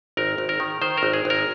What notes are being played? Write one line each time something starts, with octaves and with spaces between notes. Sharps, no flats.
G#1 A#4
G#1
A#4
D#3
D#3 C5
A#4
G#1
G#4
G#1
A#4